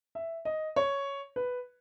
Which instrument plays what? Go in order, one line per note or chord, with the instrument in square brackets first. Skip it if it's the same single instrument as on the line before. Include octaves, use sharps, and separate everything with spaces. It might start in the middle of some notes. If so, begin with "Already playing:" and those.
[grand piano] E5
D#5
C#5
B4